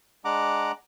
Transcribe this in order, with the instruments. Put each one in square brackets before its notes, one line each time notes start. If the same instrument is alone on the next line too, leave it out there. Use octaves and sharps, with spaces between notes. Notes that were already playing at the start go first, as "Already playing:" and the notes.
[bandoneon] G#3 D4 F#5 A#5 D6